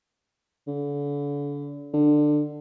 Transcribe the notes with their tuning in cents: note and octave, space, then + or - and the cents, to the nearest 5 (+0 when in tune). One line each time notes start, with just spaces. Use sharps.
D3 -35
D3 +20